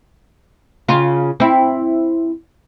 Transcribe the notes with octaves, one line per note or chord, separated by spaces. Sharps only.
C#3 F4
C4 E4